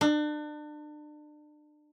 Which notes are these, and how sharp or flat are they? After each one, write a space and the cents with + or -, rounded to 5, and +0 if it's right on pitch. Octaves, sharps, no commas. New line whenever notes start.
D4 +35